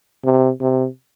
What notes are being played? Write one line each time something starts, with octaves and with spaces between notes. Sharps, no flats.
C3
C3